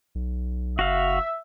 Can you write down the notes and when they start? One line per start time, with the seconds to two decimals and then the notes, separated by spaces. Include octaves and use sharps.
0.15 B1
0.79 F#1 F#4 E5 F5